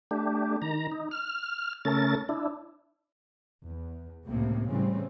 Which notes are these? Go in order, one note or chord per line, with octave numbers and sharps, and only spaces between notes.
A3 D4 G4
D#3 A#5
D#4
F6
C#3 A3 C#4 A4 A#4 A6
D4 E4
E2
C#2 A2 C3 A#3
A2 C#3 E3 G3 C4 C#4